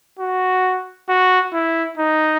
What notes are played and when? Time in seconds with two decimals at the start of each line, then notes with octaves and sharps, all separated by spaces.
0.19 F#4
1.09 F#4
1.53 E4
1.98 D#4